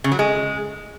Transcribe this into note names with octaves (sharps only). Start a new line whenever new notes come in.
C#3
F#3
G#3